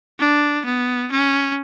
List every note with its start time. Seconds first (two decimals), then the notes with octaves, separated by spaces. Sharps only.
0.19 D4
0.65 B3
1.12 C#4